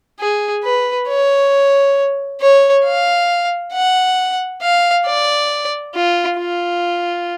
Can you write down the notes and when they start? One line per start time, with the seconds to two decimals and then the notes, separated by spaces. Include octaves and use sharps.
0.20 G#4
0.64 B4
1.08 C#5
2.41 C#5
2.85 F5
3.73 F#5
4.62 F5
5.06 D5
5.95 F4
6.38 F4